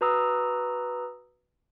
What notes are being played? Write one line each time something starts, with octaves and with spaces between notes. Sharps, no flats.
F#4 B4 A#5 D#6 E6